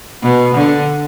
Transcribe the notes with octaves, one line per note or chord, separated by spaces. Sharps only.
B2
D3